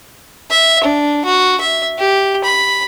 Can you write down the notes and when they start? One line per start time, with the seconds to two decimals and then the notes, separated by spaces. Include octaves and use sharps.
0.50 E5
0.84 D4
1.25 F#4
1.61 E5
1.98 G4
2.44 B5